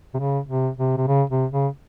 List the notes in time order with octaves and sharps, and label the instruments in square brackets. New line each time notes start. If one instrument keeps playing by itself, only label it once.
[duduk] C3
C#3
C3
C3
C3
C#3
C3
C#3